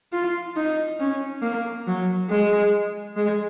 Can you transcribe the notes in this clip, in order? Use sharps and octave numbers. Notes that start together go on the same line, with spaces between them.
F4
D#4
C#4
A#3
F#3
G#3
G#3